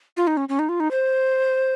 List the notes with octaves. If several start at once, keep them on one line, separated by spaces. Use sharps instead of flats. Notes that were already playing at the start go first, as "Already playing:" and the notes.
F4
D#4
C#4
C#4
D#4
F4
D#4
C5